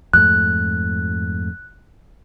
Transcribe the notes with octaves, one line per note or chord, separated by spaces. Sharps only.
F2 G#2 A3 F#6